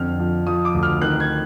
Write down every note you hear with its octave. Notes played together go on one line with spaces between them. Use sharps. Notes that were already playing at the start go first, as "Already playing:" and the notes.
Already playing: F2 D3 F6
F3
F3 D#6
D6
D2
F6
D#3 F#6
G#6